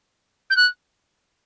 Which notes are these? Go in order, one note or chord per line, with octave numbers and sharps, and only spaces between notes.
G6
F#6